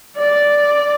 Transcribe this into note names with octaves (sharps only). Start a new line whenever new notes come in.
D5